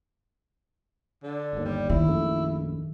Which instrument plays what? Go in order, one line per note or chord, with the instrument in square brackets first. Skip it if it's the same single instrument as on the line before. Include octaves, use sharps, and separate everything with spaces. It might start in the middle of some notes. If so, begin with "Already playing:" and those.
[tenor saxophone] D3
[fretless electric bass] G1 D#2
[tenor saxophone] G3
[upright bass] D#3 [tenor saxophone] E4
[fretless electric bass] A#1 F#2 A3